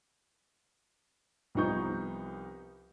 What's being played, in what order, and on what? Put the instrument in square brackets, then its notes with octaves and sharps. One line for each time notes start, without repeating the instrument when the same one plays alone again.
[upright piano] C2 F3 B3 D#4 C#6 G6